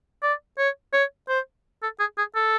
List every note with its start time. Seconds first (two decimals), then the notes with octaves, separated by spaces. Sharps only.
0.22 D5
0.58 C#5
0.93 C#5
1.29 C5
1.82 A4
1.99 G#4
2.18 G#4
2.35 A4